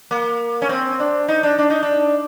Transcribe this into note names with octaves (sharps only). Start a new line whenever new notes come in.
A#3
C#4
C4
D4
D#4
D4
D4
D#4
D4